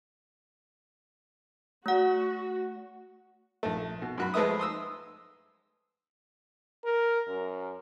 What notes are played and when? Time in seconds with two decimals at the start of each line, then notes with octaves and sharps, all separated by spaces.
1.86 A3 F#4 F#5
3.63 A#1 A3
4.02 B2
4.18 F#2 F#4 B5
4.34 F3 G#3 A3 B4 E5 D#6
4.59 C6 D#6 E6
6.85 A#4
7.28 F#2